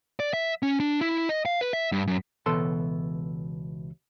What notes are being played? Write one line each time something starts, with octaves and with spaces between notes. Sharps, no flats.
D5
E5
C#4
D4
E4
D#5
F5
B4
E5
G2
F#2
C#2 B2 E3 A4 A5 C6